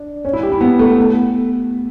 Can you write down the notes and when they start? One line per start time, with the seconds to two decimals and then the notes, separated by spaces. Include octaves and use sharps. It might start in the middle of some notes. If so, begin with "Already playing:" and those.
Already playing: D4
0.25 C#4
0.33 E4
0.43 G4
0.52 E4
0.61 B3
0.79 A3
0.98 B3